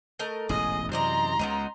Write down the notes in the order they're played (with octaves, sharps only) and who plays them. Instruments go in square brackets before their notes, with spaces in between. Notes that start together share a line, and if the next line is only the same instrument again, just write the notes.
[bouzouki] A3 A#4 D#5
[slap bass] E1 A1 G#2 [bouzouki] G#4 [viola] D#5
[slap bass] F#2 C3 E3 [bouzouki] C5 D5 D#5 [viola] A#5 C6
[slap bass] C#2 C#3 [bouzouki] B3 C4 D#4